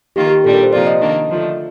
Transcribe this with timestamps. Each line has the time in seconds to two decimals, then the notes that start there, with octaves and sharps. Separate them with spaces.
0.16 D#3 A#3 F4 G4
0.30 G4
0.44 A#2 G3 D4 A4
0.53 A#4
0.63 C5
0.72 C3 F3 A#3 F4 D5
0.87 D#5
1.00 D#3 A#3 D4
1.29 D3 F3 A3